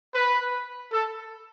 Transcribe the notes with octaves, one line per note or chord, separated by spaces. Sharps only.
B4
A4